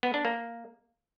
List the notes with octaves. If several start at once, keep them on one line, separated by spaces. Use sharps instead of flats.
B3
D4
A#3